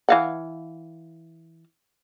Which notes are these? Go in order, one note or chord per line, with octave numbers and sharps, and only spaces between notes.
E3 F5 F#5